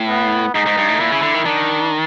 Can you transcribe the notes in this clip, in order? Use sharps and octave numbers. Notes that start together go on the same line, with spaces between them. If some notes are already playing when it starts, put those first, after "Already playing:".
Already playing: A2
B3
G#2 D#4
G#2
G2
A2
A#2 E4
C#3
D3
D#3
D#3 D4